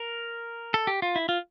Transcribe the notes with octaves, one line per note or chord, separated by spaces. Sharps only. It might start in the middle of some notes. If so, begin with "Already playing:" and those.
Already playing: A#4
A4
G4
F4
E4
F4